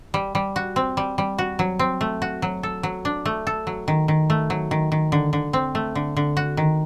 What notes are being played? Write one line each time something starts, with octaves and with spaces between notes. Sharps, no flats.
G3
G3
F#4
C4
G3
G3
F#4
F#3
C4
A3
F#4
F#3
A4
F#3
D4
A3
A4
F#3
D#3
D#3
A3
F#3
D#3
D#3
D3
D3
C4
A3
D3
D3
F#4
D#3